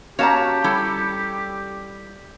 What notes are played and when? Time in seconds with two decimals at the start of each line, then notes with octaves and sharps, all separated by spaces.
0.19 C#4 F#4 G4 C#5 F5 A5 A#5
0.64 G3 E4 A4